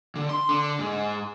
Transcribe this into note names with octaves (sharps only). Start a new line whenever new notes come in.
D3
C6
D3
G#2